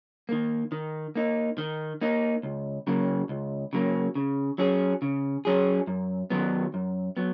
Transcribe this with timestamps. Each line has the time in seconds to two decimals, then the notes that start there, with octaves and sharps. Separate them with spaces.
0.29 D#3 A#3
0.72 D#3
1.16 A#3 D#4
1.58 D#3
2.01 A#3 D#4
2.43 C#2
2.87 C#3 F#3 A#3
3.29 C#2
3.73 C#3 F#3 A#3
4.15 C#3
4.58 F#3 C#4 G#4
5.02 C#3
5.45 F#3 C#4 G#4
5.87 F#2
6.30 D#3 F#3 B3
6.74 F#2
7.17 F#3 B3